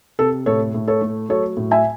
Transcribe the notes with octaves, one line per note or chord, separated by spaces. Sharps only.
C3 A4
A2 A4 C#5
A2
A4 C#5
A3
F#3 A4 C#5
A2
E5 G#5